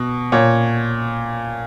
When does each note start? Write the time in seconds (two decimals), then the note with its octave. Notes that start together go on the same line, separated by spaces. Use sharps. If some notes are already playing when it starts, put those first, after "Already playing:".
Already playing: B2
0.32 A#2 C#5